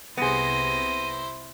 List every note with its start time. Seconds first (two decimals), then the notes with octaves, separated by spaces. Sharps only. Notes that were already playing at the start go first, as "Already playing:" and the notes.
0.17 C2 C3 B3 E4 G#4 C5 A#6 D#7